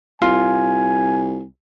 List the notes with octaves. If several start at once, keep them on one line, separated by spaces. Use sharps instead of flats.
C2 F4 G#5